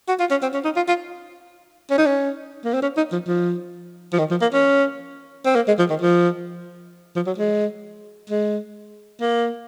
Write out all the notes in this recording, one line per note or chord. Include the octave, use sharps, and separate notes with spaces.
F#4
F4
C#4
C4
C#4
D#4
F4
F4
C#4
D#4
C#4
A#3
C4
C#4
D#4
F3
F3
F3
D#3
F3
A#3
C#4
C4
A#3
G#3
F3
D#3
F3
F3
F#3
G#3
G#3
A#3